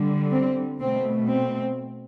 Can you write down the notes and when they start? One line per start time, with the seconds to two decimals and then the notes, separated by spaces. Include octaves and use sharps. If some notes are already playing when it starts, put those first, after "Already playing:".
Already playing: D3 G3
0.32 C4
0.80 B2 A3 C4
1.30 C4